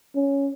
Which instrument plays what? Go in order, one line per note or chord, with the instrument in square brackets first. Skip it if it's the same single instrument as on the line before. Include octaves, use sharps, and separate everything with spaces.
[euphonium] C#4